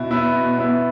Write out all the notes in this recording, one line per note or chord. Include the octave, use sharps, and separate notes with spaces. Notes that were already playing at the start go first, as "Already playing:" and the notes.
Already playing: B2 B3 E4
B3 E4
B2
B3 E4